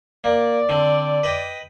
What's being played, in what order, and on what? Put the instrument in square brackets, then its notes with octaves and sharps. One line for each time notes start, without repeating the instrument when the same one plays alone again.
[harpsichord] A#3 [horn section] D5
[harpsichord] D3 C4
B4 D#5 G5